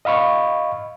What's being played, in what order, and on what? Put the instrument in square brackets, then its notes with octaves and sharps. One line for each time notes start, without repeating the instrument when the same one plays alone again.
[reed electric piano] D#5 F5 B5 C#6